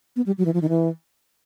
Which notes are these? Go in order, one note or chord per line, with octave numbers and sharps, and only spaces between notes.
B3
G3
F#3
E3
F3
D#3
E3